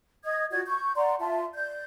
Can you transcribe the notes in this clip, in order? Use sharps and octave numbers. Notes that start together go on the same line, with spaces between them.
D#5 D#6 G#6
F4 F#4 D5 G#6
C#6 G6
D5 F#5 A#5 C6
F4 E5 A5 C6
D5 G6